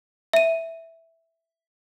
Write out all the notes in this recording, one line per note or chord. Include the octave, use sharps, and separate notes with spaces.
E5 D#7